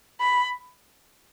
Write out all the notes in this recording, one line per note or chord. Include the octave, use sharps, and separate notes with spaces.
B5